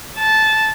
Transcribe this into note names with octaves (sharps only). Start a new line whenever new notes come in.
A5